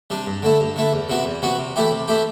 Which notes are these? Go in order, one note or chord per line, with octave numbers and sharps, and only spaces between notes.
C3 G3 D4
G2
D3 A3 E4
G2
D3 A3 E4
E2
C3 E3 B3 F#4
E2
C3 E3 B3 F#4
C3
E3 A3 E4 G4
C3
E3 A3 E4 G4